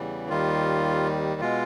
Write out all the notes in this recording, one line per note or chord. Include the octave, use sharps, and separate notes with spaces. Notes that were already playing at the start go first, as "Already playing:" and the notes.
Already playing: E2 C#3 E3 G3
D#2 D#3 G3 F4
B2 G#3 F4